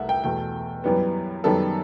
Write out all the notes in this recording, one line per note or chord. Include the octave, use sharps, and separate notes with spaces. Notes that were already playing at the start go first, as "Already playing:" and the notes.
Already playing: C2 A3 E5 F#5
G5
E2 B2 A3 G5
F#2 E3 G3 B3
F#2 D#3 G3 B3 A4